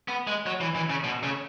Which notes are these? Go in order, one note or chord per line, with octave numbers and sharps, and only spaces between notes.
B3
G#3
F#3
E3
E3
C#3
B2
C#3